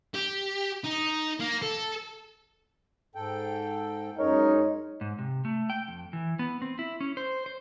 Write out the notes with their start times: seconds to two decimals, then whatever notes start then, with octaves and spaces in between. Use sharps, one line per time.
0.14 G4
0.84 D#4
1.40 A#3
1.62 A4
3.15 G#2 A4 G5
4.18 F#2 G#3 D#4 A#4 C#5
5.01 G#2
5.18 C3
5.45 A3
5.70 G5
5.88 F2
6.13 E3
6.39 B3
6.62 C4
6.79 E4
7.01 C#4
7.17 C5
7.46 C5